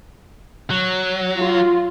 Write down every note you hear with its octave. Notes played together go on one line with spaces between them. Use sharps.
F#3
F4